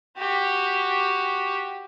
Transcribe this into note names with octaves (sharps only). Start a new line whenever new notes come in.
F#4 G4